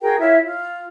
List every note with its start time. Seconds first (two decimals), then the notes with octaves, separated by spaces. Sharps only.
0.01 F#4 G#4 A#4 G5
0.19 E4 F4 C#5 E5
0.44 F4